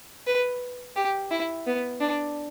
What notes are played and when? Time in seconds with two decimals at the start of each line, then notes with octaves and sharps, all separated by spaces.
0.27 B4
0.96 G4
1.31 E4
1.66 B3
2.01 D4